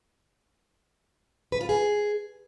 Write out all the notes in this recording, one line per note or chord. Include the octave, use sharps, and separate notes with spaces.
B4
F4
G#4